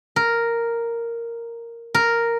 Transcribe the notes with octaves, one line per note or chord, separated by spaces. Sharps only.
A#4
A#4